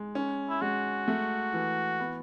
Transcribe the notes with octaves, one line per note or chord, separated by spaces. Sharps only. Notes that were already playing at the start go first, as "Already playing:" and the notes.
Already playing: G#3
C#4
E4
G#3 F#4
A3
E3
B3